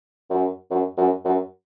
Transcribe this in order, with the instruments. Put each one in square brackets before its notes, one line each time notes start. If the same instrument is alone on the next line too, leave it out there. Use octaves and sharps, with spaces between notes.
[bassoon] F#2
F#2
F#2
F#2